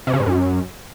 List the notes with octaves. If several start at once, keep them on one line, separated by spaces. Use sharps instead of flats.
C3
C#3
G#2
F#2